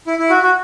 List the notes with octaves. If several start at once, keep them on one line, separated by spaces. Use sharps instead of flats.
E4
E4
F#4
F#4